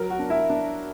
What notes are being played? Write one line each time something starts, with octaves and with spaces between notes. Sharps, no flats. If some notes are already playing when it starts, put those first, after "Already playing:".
Already playing: F#3 A#4
F#4
D4
E4
D4